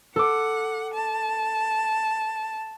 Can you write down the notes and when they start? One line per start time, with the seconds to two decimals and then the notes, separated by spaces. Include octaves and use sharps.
0.16 A4 F#5 D6
0.93 A5